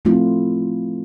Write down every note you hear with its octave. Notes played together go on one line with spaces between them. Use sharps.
F3 A3 C4 E4 F4